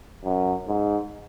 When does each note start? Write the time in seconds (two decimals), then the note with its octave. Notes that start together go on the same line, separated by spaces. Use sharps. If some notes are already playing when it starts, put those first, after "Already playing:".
0.25 F#2
0.67 G#2